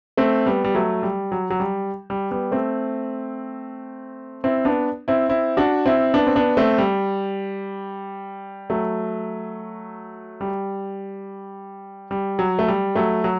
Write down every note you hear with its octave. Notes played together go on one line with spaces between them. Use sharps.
A3 C4
G3 B3
G3
F#3 A3
G3
F#3
F#3
G3
G3
G3 B3
A3 C4
C4 E4
B3 D4
C4 E4
C4 E4
D4 F#4
C4 E4
B3 D4
C4
B3 D4
A3 C4
G3
F#3 A3
G3
G3
F#3
A3
G3
F#3 A3
F#3